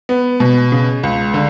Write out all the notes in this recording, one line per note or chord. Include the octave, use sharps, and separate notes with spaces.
B3
B2
C#3
C#2
D3